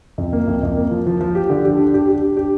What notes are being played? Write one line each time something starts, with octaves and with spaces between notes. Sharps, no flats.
F2
A#3
F2
F2
A#3
F3
F3
F3
G4
D3
G4
D4
G4
G4
D4
G4